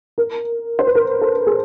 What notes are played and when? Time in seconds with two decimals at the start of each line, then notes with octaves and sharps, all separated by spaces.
0.18 A#4
0.79 C5
0.87 B4
0.95 A#4
1.21 A4
1.47 G#4